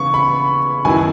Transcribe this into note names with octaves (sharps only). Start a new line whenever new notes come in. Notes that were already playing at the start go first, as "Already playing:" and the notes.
Already playing: C#3 E3 B3 C#6
B5
F#2 D#3 F#3 B3 E4 G#5